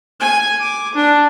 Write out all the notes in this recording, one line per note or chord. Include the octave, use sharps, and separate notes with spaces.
G#5
D6
D4